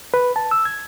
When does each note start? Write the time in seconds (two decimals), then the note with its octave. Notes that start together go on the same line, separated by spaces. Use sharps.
0.14 B4
0.36 A5
0.51 E6
0.65 G#6